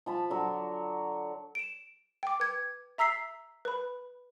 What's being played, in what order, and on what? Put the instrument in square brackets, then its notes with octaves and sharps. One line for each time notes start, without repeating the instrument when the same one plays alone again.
[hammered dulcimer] F3 A5 B5
D3 F#3
[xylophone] D7 E7
G5 D6
B4 G#6
E5 A#5 E6 B6 C7
B4 B5